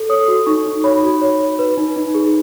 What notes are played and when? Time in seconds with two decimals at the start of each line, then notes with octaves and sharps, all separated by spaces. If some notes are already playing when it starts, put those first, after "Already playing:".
Already playing: A4
0.09 C#5 D#6
0.28 F#4
0.46 D#4 C#6
0.66 D#4
0.84 C#5 B5
1.03 F#4
1.21 C#5
1.40 C#5
1.59 B4
1.78 D#4
1.96 D#4
2.14 G#4